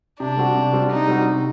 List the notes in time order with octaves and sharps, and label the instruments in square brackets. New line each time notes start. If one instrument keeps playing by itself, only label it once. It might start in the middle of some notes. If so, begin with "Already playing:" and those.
[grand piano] C3 [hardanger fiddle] D4
[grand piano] G3 C4 F#4
C3
G3 C4 F#4
[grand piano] C3 [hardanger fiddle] D#4
[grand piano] G3 C4 F#4
C3